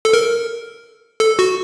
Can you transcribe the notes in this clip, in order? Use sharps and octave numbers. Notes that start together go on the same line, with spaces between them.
A4
A#4
A4
F#4